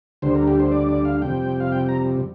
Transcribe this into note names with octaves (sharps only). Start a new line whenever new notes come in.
D2 D3 G3 C5
A#4
G4
C5
D5
D5
F5
F2 C3 G3 G5
F5
G5
A#5